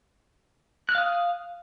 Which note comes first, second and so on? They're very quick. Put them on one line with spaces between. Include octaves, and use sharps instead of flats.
F#6 F6 F5 D#6